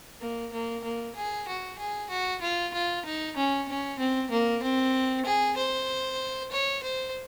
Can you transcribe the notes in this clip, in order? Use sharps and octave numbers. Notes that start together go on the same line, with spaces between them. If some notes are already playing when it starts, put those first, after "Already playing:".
A#3
A#3
A#3
G#4
F#4
G#4
F#4
F4
F4
D#4
C#4
C#4
C4
A#3
C4
G#4
C5
C#5
C5